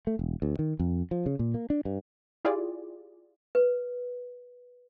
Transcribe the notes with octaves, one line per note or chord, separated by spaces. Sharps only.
A3
E1
D2
D#3
F2
F3
C#3
A#2
A#3
D4
G2
E4 F4 G4 G#4 D5
B4